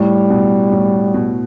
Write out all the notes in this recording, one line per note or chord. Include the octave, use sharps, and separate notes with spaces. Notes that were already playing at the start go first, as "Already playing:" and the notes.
Already playing: A2 G3
B2
A2
B2